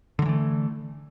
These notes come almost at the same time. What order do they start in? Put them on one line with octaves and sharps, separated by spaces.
D3 F#3 E3 A3